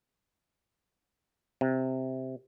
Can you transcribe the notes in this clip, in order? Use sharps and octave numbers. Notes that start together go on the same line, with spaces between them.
C3